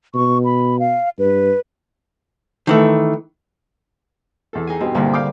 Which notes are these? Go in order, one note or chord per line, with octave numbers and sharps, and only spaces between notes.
B2 C#6
B5
F5
G2 B4
D#3 E3 A3
E2 A4
D#4 G#4 G#5
G2 B2 C4
C2 G2 A#2 D3 G3 A#3
F5 G5 D6